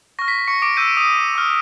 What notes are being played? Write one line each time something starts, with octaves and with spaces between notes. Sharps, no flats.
C#6 F6 A#6
B6
B6
C#6 C#7
D6 D7
C#6 E6 G6 D#7
D7
D#6 D#7
C#6 F6